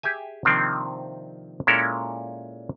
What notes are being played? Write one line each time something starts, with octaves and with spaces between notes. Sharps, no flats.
G4 G#4 E5 G#5
C3 D#3 F3 A#3 C4 D4
A#2 G#3 C#4 E4 A4 A#4